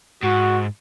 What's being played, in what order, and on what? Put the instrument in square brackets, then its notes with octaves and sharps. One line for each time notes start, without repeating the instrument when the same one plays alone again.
[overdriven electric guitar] G#2 [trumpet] F#4